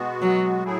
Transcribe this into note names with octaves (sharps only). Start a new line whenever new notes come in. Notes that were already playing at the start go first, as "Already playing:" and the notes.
Already playing: B2 G#3 B3 F#4
F#3
A2 F#3 A3 E4 G#4